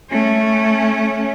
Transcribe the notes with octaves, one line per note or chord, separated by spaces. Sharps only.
A3 C#4